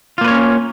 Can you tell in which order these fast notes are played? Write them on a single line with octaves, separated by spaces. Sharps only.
F4 A#3 B4 C#5 C#4